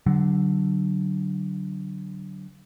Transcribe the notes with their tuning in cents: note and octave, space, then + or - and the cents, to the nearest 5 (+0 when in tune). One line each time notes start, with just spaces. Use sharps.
D3 +0 F#3 +25